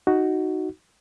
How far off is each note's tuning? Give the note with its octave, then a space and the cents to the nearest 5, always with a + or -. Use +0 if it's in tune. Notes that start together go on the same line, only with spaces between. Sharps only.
D#4 +0 F#4 +5